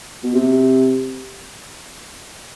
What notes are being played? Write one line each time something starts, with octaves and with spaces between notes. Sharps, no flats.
B2
C3